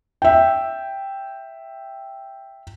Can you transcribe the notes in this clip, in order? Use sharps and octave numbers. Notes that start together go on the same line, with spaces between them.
E5 G5